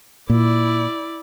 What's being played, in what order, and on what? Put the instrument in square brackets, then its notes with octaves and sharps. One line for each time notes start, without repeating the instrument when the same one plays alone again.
[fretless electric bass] A#2 [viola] E4 D5